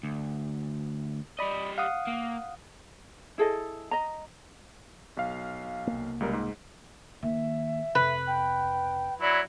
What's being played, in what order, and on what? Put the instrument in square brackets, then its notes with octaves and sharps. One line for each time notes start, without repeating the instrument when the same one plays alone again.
[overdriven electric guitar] D2
[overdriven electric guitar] G3 D#5 [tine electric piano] D5 B5
[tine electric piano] F5 F#5 D#6
[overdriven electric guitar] A#3
[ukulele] E4 G#4 A4 D#5
D#5 A#5
[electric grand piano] B1 F5
[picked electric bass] C2 A#3
[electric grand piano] C#2 G3 A#4
G#2
[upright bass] D#3 A#3 [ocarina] E5
[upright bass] F2 C3 [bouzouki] B4
[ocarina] G5
[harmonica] F#3 E4 B5 [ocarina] D5